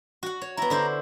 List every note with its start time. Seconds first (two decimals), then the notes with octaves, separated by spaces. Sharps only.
0.23 F#4 F#5
0.41 C#5
0.57 B3 E4 A#5
0.70 D3 E4 C5